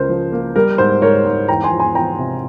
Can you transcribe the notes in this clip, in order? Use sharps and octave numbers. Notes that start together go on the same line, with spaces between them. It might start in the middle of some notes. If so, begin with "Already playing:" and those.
Already playing: C#2 C#3 A#4 C5
F3
A#3
G3 A#4
G#2 C5
G#2 A#4 C#5
G#2
E2 G5 A#5
G#5 C6
F3
G#5 C6
E2 G5 A#5
C3